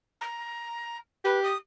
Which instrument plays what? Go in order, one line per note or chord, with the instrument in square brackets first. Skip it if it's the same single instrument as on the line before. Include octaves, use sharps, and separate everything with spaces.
[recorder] A#5
[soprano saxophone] G4 [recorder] B4
[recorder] D#6